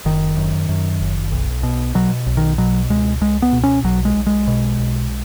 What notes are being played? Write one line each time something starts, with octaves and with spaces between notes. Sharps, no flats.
F#1 D#3
F#2
F#2
F#1
B1
B2
B2 F#3
B1
D#3
B2 F#3
C#2 G#3
C#2 G#3
B3
B2
C#4
B1 F#3
G#3
B1
G#3
B2
B1